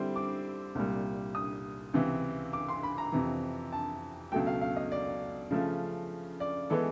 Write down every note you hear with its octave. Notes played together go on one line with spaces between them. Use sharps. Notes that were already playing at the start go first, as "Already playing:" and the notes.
Already playing: D3 G3 C4 E4 C6
D6
C2 A#2 G3
D#6
C#2 C3 E3
D6
C6
B5
A#5
F2 C3 E3
A5
C#2 B2 F#3 A3 G5
F5
F5
D#5
D5
C#3 F3 A3
D5
E3 G#3 B3 A4